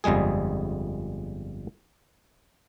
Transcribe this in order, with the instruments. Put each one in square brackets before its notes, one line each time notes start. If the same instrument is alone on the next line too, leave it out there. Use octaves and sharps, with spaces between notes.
[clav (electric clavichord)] G1 F2 G3 G#3 G#4